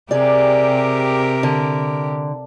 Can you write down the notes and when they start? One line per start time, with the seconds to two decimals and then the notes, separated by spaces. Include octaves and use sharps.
0.11 C3 G4 G#4 A#4 D5
1.43 D3